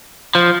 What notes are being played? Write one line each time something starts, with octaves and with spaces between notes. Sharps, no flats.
F3